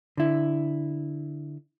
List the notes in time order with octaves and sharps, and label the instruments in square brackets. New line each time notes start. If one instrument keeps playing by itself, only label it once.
[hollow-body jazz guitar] D3 E4